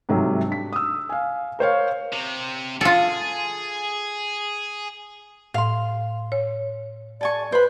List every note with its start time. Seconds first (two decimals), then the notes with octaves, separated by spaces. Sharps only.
0.09 G#2 C3 F#3 G3 A3
0.48 D4 B6
0.73 D#6 E6
1.09 F5 G#5
1.59 A#4 C5 C#5 F5
2.13 C3
2.81 F4 G#4 A4
5.54 A2 F5 C6
6.32 C#5
7.21 A4 D5 G#5 C#6
7.52 B4 C5 B5